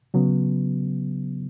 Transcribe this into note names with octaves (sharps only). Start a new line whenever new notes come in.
C#3 F#3 B3